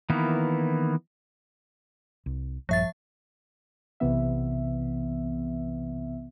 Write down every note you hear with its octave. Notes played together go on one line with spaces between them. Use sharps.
D#3 E3 A#3 B3 E4
C2
A#1 G2 F3 E5 A6
B1 C3 E3 B3 E5